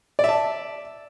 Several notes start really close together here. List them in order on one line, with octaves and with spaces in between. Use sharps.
D5 E5 A5